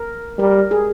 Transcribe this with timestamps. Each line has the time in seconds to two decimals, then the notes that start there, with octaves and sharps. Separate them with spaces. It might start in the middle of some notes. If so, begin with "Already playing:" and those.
Already playing: A#4
0.38 G3 A#4
0.71 G#4